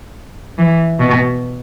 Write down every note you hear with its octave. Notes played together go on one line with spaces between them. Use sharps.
E3
B2